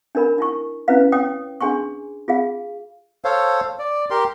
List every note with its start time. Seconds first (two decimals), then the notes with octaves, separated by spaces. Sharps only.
0.15 D4 D#4 A#4 B5
0.38 D#4 E4 C#6
0.88 C#4 E4 B4 F5
1.12 C#5 G5 D#6
1.61 D4 G#4 G#5 C6 C#6
2.28 F4 G#4 F5
3.25 A4 C5 C#5 F5
3.79 D5
4.10 G4 A#4 C6